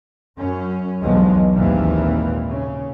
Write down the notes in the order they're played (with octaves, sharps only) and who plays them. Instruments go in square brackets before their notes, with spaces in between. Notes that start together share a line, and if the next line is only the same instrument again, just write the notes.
[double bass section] F#2 C#4
B1 E2 G2 F3 F#3 G#3
G#1 D#2 A#2 E3 A#3 C4
C#3